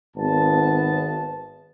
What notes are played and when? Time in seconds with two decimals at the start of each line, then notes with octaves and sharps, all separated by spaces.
0.16 G#1 B3 A5